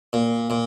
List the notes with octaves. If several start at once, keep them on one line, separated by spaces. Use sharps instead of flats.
A#2
A#2